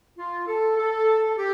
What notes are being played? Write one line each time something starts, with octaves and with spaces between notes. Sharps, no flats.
F4
A4
A4
G4